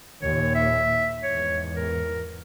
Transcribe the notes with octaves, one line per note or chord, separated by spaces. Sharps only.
D#2 A#2 C#5
E5
E2 G#2 C#5
A#4